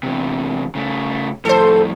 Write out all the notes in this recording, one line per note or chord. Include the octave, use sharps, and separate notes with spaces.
E2 C3
C#3 A3
F2 A2 A4 C5